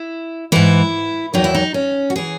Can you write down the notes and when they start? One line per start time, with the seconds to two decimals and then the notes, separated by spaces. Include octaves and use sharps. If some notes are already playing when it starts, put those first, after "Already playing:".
Already playing: E4
0.52 G#2 E3 E4
1.34 E2 D#3 F#3 D#4
1.44 E4
1.55 D#4
1.74 C#4
2.10 F#4
2.16 E3 G#4